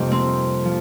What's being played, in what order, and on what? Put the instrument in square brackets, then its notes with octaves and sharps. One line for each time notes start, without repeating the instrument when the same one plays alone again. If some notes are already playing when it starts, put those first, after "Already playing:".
Already playing: [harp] F2 C3 G3 A#3 D#4
C4
F3